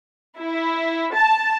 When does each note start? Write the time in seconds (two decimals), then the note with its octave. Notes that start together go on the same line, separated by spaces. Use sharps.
0.40 E4
1.15 A5